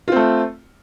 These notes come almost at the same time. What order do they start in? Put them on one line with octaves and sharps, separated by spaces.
F4 C4 A3